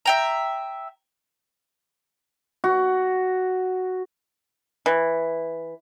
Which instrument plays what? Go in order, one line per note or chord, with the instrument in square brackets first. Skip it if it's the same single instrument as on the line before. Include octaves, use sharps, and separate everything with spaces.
[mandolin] E5 G5 A#5
[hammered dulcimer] F#4
[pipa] E3